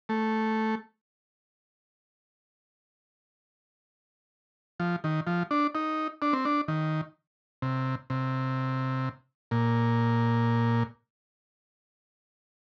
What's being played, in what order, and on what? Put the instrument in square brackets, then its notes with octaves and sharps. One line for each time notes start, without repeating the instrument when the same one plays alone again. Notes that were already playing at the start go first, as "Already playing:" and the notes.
[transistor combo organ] A3
F3
D#3
F3
D4
D#4
D4
C4
D4
D#3
C3
C3
A#2